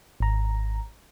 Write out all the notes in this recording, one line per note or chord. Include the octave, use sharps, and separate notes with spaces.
G#1 A#5